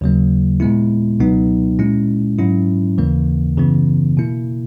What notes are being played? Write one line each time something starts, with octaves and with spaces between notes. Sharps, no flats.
D#2 C#3 F#3 A#3
A#2 G#3 B3 E4
C#2 B2 F#3 B3 D#4
A#2 G#3 C#4 E4
G#2 F#3 C#4 E4
D#2 C#3 E3 A#3
F#2 C#3 E3 B3
B2 A#3 E4